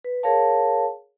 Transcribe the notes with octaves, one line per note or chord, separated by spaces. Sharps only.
B4
G#4 A#4 C#5 F5 A5